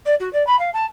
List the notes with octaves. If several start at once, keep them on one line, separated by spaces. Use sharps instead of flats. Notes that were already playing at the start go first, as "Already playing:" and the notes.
D5
F#4
D5
B5
F5
A5